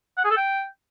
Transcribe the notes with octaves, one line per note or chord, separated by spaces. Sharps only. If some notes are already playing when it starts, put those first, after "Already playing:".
F#5
G#4
A4
G5